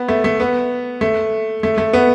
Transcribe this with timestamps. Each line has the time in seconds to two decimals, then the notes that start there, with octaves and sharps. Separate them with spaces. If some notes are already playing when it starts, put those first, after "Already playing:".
Already playing: B3
0.09 A3
0.24 A3
0.40 B3
1.01 A3
1.63 A3
1.78 A3
1.93 B3